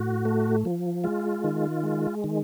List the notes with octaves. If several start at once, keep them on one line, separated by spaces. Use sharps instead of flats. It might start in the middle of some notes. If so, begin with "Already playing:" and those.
Already playing: A2 F#4
A3
F3
G#3 F4
D#3
G#3
D#3